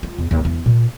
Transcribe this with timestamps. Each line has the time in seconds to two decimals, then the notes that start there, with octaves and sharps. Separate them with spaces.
0.03 F4
0.18 E2
0.31 D#2
0.45 E2
0.66 A#2